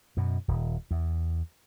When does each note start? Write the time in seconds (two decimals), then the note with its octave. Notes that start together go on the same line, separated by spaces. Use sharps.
0.17 F#2 B2
0.48 D#1
0.91 E2